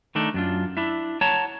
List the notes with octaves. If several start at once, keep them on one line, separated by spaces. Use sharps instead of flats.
D#3 A3 D4 D#4
F#2 D4 F4
D4 E4 E5
C#5 F#5 A5 A#5